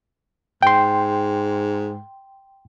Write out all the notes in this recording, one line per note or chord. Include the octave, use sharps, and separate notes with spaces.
G#2 G5 C6